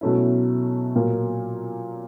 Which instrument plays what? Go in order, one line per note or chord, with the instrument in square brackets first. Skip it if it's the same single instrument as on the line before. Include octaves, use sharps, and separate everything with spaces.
[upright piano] B2 F#3 A3 C#4 E4
A#2 F#3 A#3